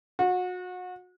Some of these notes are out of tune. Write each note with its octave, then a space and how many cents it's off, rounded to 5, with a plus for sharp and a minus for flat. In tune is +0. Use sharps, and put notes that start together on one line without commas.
F#4 -30